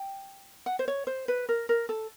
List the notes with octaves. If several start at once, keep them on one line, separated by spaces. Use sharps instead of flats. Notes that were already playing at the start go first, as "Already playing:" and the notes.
Already playing: G5
F#5
C5
C#5
C5
B4
A#4
A#4
A4